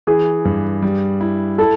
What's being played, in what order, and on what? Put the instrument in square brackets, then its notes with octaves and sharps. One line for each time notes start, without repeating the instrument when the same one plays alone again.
[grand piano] E3 [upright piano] G#4
[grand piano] G2
G3
E4
[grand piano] E4 [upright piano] A4